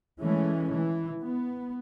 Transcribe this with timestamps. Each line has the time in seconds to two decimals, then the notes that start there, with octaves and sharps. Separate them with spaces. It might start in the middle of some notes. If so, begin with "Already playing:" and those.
0.21 E3 G#3 A3 C#4
0.72 E3
1.21 B3